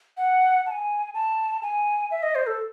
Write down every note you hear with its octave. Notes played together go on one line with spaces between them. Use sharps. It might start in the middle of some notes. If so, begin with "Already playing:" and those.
F#5
A5
G#5
A5
G#5
E5
D#5
C5
A4